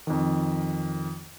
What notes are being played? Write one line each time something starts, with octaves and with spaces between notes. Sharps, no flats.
F2 D#3